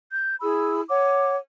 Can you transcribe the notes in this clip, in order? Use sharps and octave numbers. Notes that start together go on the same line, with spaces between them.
G6
E4 G#4 B5 E6
C#5 F#5 D6